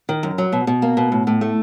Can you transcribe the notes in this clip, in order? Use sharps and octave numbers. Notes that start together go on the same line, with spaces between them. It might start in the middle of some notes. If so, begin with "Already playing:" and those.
D#3
F#2
F#3
B2
B2
A#3
B2
A2
A2
A3